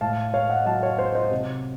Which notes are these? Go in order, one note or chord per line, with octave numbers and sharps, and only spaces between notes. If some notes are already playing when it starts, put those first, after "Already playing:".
A2 F5 A5
A2 C#5 F5
D#5 F#5
F#3 F5 A5
C#5 F5
F#3 C5 D#5
C5 D#5
C3